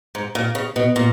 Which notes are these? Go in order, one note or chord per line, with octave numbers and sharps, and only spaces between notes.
G#2
A#2
C#3
B2
A#2